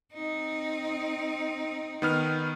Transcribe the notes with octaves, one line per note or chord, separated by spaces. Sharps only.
C4 D#4
D#3 B3 F6